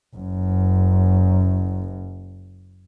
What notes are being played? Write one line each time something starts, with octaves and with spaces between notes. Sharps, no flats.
F#1 F#2